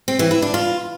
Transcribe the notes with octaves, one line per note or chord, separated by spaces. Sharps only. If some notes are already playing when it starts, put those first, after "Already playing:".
C4
E3
E4
D4
F4